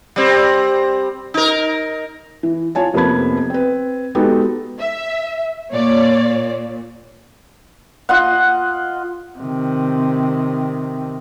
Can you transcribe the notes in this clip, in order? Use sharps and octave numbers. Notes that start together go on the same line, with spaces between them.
G3 C4
D#4 A#4
E3
F4 C#5 G#5 A5
F1 F2 A#3 B3 B5 G#6
C4 B4
G#3 B3 D#4 F#4 G4 A4
E5
A#2 C#5 D5
F4 D#5 F#5
C3 D#3